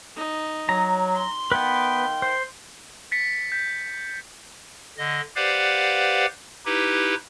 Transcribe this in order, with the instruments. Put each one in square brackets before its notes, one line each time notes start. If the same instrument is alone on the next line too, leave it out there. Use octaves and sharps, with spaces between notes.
[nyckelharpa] D#4
[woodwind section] F#3 [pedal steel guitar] A#5
[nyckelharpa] C6
[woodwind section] D#3 F5 G5 [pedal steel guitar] B3 B4
[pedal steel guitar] C5
[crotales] A6 B6 C#7
G6 B6
[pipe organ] D3 D#5
G4 B4 C5 D5 F5 F#5
D#4 E4 G4 B4